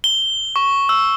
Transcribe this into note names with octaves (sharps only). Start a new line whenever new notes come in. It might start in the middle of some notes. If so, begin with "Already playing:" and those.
G7
C#6
E6